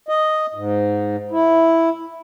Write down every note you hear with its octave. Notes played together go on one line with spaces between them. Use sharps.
D#5
G#2
E4